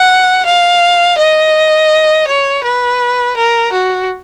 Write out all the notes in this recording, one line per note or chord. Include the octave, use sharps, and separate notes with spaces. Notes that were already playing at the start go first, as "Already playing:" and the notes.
Already playing: F#5
F5
D#5
C#5
B4
A#4
F#4